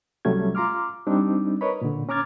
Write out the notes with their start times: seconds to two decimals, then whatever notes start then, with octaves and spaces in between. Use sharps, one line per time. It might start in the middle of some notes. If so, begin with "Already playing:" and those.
0.25 C2 F#3 G3 A3 C#4 G#6
0.55 F4 A#5 C6 D6 F6
1.07 G3 C4 D4 D#4
1.61 A#4 B4 C#5 D#5 B5
1.81 A#2 D3
2.09 C#4 A#5 D6 F6 G#6 A6